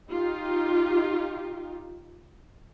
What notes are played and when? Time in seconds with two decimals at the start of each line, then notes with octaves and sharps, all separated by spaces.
0.10 D#4 F4 G4